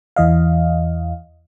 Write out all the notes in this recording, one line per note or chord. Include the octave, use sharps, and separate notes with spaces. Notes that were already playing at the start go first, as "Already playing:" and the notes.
E2 E3 D#5 F5